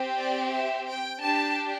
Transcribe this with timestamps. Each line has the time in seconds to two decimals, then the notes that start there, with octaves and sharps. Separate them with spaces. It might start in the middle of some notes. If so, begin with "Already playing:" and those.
Already playing: C4 G4
0.17 D5
0.52 E5
0.87 G5
1.22 D4 G4 A5